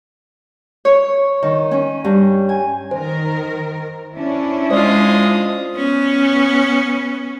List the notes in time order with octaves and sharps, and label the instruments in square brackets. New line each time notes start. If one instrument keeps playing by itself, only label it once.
[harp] C#5
D#3
C#4
G2
G#5
[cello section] D#3 A#4 [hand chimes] C5
[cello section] C#4 D4 E4
[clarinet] G#3 [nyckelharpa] F4 D#6 [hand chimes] C5 D5
[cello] B3 C#4